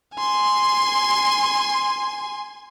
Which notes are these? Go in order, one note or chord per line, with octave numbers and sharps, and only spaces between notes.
G#5 C6